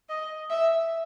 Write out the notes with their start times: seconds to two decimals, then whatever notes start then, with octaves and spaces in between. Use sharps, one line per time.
0.09 D#5
0.50 E5